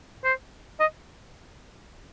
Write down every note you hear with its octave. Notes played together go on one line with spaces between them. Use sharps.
C5
D#5